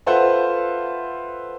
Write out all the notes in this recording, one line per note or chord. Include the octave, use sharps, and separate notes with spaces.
F4 A4 B4 C5 E5 F#5